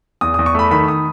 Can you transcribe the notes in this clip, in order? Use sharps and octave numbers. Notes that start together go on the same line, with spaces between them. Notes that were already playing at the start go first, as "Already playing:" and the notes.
E2 D#6
D#6
E2
C#6
A3 B5
D#3 B5
D#6